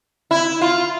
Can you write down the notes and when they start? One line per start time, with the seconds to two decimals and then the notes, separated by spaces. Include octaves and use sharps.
0.31 E4
0.61 F4